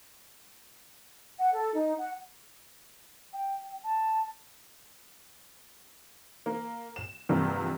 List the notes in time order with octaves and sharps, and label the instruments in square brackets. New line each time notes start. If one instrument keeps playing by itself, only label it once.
[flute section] F#5
A4
D#4
F#5
[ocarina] G5
A5
[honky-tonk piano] A#3
E7
E2 G2 C3 F3 A#3